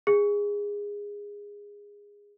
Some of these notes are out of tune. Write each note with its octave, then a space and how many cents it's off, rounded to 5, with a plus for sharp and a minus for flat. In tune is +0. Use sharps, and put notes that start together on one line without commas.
G#4 -20